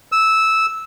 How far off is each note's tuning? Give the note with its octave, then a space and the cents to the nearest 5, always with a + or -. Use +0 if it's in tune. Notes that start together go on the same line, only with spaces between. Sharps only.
E6 -10